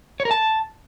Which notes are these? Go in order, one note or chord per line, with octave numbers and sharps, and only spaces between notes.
C#5
A#4
A5